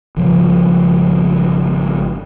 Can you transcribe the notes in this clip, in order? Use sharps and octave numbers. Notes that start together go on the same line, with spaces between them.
G#1 C#3 F3 G3